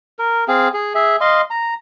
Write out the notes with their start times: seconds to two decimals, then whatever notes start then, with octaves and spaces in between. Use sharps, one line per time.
0.19 A#4
0.48 C4 G#4 F5
0.74 G#4
0.95 G#4 E5
1.21 D#5 F5 C6
1.50 A#5